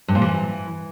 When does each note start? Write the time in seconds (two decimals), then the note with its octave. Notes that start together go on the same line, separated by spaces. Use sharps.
0.08 G2
0.15 A#2
0.22 E3